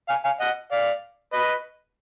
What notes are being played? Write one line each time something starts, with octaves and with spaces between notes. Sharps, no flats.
F5 G#5
F5 G#5
D#5 F#5
D5 F5
B4 D#5